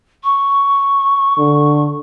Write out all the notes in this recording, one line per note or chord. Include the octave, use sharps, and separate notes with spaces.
C#6
D3